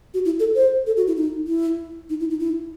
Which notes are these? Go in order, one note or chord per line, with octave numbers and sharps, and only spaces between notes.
F#4
E4
A4
C5
A4
F#4
E4
D#4
E4
D#4
E4
D#4
E4